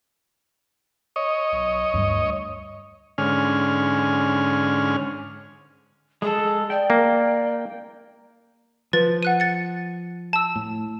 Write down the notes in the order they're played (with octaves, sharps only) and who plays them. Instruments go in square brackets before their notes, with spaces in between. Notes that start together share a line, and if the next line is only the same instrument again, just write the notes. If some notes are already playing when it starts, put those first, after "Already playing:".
[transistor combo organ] C#5 D#5
[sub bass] B1
[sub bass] D2 [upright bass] G2
[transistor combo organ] G#2 D3 C#4 G#5 F6
[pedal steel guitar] G#3 A4 [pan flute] G#4
[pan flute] D5 [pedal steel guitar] G5
[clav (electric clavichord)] A#3
[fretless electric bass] F3 [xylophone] B4 A6
[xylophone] F#5 F#6 D#7
A6 C#7
A5 E6
[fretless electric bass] A2